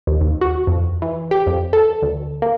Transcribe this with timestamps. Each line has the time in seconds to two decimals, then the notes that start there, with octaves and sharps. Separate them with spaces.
0.07 D#2
0.21 D#2
0.41 F#4
0.67 F2
1.02 E3
1.31 G4
1.46 F2
1.73 A4
2.02 D2
2.42 A#3